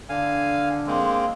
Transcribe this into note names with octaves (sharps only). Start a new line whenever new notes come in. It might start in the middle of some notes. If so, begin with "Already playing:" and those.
D3 F5 G#5
G#3 A#3 C4